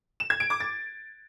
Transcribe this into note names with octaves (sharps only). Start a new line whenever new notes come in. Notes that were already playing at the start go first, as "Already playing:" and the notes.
E7
G#6
D7
D6
A6